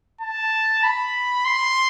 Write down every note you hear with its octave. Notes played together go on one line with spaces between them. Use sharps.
A5
B5
C6